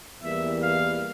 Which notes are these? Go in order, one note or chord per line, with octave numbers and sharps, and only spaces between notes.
E2 E3 G3 A#3 E5
F5